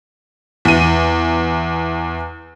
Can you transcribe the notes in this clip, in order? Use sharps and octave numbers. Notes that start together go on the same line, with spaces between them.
E2 D#7